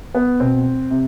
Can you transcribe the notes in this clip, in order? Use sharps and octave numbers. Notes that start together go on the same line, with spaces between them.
B3
B2 C4
C3